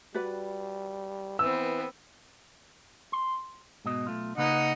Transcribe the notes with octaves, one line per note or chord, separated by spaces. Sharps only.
G3 F#4 B4 D5
E3 B3 C4 E6
C6
G#2 B2 D#5
B1 A3 F4
C#3 A#3 D#4 B4 D#5 F#5